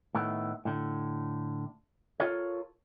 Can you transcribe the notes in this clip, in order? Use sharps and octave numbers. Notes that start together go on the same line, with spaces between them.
A2 D#3 A3 B3
A2 D3
F4 A4 A#4 C#5